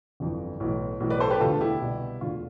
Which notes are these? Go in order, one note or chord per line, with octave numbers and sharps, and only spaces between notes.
G1 F2 E3
B1 A2 E3
B1 A2 E3
B4 D5
A4 C5
G4 B4
E1 D2 D3 F4 A4
E4 G4
C2 B2
E1 D2 D3 F4